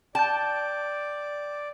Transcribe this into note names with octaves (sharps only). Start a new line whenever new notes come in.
D5 G5 A5 G6